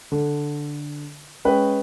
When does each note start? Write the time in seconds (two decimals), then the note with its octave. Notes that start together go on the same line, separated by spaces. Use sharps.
0.12 D3
1.45 G#3 C#4 B4 G5